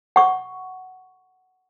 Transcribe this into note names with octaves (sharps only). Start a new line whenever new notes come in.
F#5 C#6